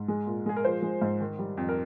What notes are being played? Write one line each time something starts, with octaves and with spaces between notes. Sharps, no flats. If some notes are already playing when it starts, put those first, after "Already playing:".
Already playing: G#2
G#3
A#2
G#3 G#4
A#4
F3 C5
G#3
G#2
D#3
G3
F2
A#4